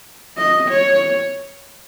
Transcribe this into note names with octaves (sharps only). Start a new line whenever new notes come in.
D#5
C#5